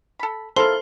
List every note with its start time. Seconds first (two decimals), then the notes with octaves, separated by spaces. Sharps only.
0.19 A4 B5
0.56 A#3 E4 F4 A4 C5 C6